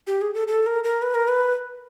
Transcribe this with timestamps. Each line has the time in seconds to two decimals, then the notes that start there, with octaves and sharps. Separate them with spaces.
0.07 G4
0.21 G#4
0.34 A4
0.48 A4
0.66 A#4
0.84 A#4
1.02 B4
1.14 A#4
1.28 B4